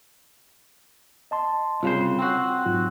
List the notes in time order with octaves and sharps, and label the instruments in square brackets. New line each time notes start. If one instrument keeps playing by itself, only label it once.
[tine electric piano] D#5 A5 C6
[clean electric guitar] C2 C#3 C5 [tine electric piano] F4
[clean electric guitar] C4 F#4 [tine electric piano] G5 C6
[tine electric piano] G#2 F#3 F4